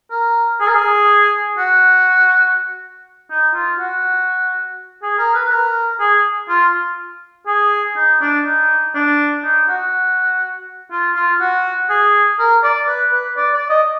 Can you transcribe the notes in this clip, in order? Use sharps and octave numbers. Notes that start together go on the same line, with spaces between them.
A#4
G#4
A#4
G#4
F#4
D#4
F4
F#4
G#4
A#4
B4
B4
A#4
G#4
F4
G#4
D#4
D4
D#4
D4
D#4
F#4
F4
F4
F#4
G#4
A#4
D5
B4
B4
D5
D5
D#5